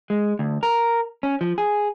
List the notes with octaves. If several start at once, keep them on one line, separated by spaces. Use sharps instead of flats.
G#3
D2
A#4
C#4
F3
G#4